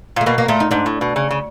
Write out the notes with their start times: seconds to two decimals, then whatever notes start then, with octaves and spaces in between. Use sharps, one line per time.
0.16 A#2 A3
0.26 B2 A#3
0.38 A#3
0.48 A#2 A3
0.60 D#4
0.71 G#2 D4
0.86 A2
1.01 B2
1.16 C#3
1.31 C#3